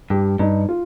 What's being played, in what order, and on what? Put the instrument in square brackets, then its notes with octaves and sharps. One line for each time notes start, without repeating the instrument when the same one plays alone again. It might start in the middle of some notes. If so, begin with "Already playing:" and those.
[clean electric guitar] G2 [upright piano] G4
[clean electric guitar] G2 [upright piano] D#4
[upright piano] F4